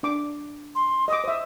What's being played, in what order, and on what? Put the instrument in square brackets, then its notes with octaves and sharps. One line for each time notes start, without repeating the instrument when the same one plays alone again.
[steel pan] D4 D6
[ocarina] C6
[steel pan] D#5 D6 [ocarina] D#6
[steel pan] C5 E5